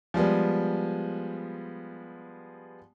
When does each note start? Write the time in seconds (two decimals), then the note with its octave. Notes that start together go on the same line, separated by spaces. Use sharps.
0.14 F3 G3 G#3 B3